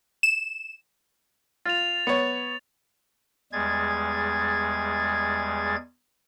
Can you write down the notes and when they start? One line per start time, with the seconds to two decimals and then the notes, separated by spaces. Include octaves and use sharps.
0.23 E7
1.65 F4 A6 F7
2.07 B3 C#5
3.52 E2 G3 G#3 G#4 G#6 A6